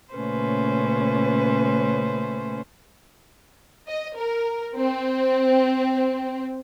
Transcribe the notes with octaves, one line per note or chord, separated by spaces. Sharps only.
A#2 C#3 A3 C#4 B4 C5
D#5
A#4
C4